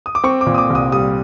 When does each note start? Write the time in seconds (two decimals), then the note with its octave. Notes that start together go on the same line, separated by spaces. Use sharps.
0.06 D#6
0.15 D6
0.24 C4 C#6
0.41 D6
0.47 A#2
0.54 D#6
0.58 D6
0.70 C2
0.75 D#6
0.92 G3 D#6